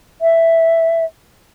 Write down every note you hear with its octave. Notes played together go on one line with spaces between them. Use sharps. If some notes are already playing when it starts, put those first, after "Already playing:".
E5